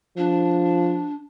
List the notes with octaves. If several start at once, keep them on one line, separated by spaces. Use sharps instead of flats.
F3 D4